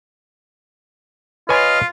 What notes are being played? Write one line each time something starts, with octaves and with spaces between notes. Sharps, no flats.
F4 B4 C#5 D#5 G#5 F6